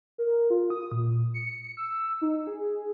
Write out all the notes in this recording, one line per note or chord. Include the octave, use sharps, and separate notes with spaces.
A#4
F4
D#6
A#2
C#7
E6
D#4
G#4